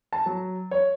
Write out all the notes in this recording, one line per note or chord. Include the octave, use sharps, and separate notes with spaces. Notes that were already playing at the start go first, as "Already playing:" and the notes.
A5
F#3
C#5